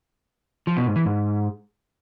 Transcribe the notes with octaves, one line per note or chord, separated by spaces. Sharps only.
F3
B2
G#2
E3
G#2